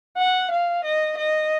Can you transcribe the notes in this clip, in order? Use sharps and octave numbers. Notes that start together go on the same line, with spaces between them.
F#5
F5
D#5
D#5